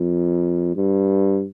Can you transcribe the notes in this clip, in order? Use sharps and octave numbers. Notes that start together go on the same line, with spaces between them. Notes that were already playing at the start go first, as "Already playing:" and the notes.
Already playing: F2
G2